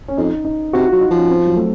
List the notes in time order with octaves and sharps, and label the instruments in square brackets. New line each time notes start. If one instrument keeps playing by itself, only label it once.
[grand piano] C#4
[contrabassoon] F2 [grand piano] D#4
[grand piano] D#4
[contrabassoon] C3 [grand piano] F#4
[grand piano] F4
[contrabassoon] F#3
[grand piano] D#4
[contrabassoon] F3 [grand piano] C#4
[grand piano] C4
F#3
A3